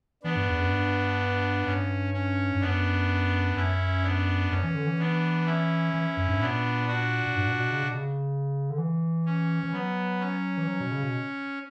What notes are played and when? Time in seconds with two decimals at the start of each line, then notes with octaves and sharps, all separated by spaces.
0.23 E3 B3 D4
0.36 G2
0.48 E2
0.60 F#2
0.71 G2
1.66 G2 C#4
2.14 C#4
2.55 G2
2.61 F#2 B3 D4
3.55 F#2 C#4 E4
4.03 B3 D4
4.51 F#2 C#4
4.63 E3
4.75 D3
4.87 E3
4.99 B3 D4
5.45 C#4 E4
5.94 E3
6.17 F#2
6.28 G2
6.40 A#2 B3 D4
6.88 D4 F#4
7.26 A#2
7.36 G2
7.47 A#2
7.59 B2
7.71 C#3
7.83 B2
7.93 C#3
8.70 D3
8.78 E3
9.26 C#4
9.63 E3
9.72 F#3 B3
10.20 C#4
10.57 E3
10.67 F#3
10.80 B2
10.91 C#3
11.03 B2